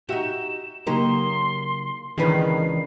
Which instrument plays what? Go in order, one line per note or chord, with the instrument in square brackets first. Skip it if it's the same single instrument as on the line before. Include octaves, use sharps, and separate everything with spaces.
[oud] D#4 F#4 [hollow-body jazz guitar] G4 E5 [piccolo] E7
[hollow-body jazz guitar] C#3 F#3 G4 [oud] A#3 D#4 [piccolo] C6
[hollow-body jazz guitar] C#2 E3 G#4 [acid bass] D#3 [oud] C#4 D4 B4 [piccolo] C7